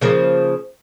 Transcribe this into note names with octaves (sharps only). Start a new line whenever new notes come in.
C#3 F3 A#3